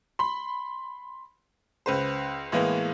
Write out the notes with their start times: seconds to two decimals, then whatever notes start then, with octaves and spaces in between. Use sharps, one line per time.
0.19 B5 C6
1.86 C#2 B4 C5
2.52 A2 E3 G#3 A#3 B3